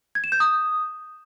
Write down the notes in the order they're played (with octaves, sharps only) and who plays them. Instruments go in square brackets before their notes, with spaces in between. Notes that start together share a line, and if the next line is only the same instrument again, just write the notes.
[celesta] G#6
E7
G6
D#6